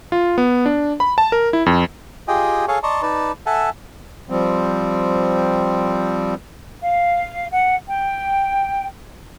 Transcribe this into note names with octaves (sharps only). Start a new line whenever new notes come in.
F4
B3
D4
B5
A5
A#4
E4
F2
F4 G4 G#4 D#5 G5 G#5
G#4 A4 C#5 F5 G#5 C#6
D5 D#5 A5 A#5 C6 C#6
D#4 B4 D5 A5
A4 E5 F#5 G#5 A5
F3 G3 C4
F5
F#5
G5